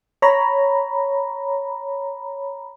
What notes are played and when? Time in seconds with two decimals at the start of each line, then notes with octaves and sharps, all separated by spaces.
0.22 C#5 A#5 B5